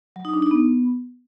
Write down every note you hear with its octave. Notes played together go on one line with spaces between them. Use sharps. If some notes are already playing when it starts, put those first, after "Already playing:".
F#3
D#4
D4
D#4
B3